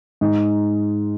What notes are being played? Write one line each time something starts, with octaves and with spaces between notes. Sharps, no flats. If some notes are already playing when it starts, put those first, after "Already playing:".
G#2